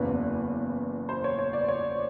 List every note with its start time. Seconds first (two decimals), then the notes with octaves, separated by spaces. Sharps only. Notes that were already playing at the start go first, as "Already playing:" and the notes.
Already playing: F#1 E2 C#3 B4
1.09 C5
1.24 C#5
1.39 C#5
1.53 D5
1.68 C#5